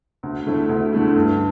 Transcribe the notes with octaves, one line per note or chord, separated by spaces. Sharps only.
D2
D3 A3 E4
D2
D3 A3 E4
G2